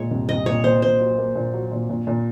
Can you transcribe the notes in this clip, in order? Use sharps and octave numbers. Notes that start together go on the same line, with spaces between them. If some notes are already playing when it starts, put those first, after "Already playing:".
Already playing: A#2 G#3 C#5
C2
C2 D#5
A#2 C#5
A#2 C5
A#2 C5
F#3
A#3
A#2
F#3
A#2
A#2
A#2